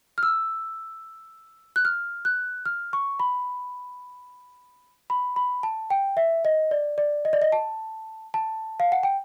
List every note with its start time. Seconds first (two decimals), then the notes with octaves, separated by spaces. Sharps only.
0.18 F6
0.23 E6
1.76 F#6
1.85 F6
2.25 F#6
2.66 F6
2.93 C#6
3.20 B5
5.10 B5
5.36 B5
5.63 A5
5.90 G5
6.17 E5
6.45 D#5
6.71 D5
6.98 D5
7.25 D#5
7.33 D5
7.42 D#5
7.52 A5
8.34 A5
8.80 F5
8.92 F#5
9.03 G5